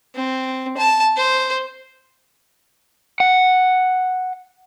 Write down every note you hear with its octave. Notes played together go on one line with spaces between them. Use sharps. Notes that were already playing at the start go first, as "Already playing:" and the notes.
C4
A5
C5
F#5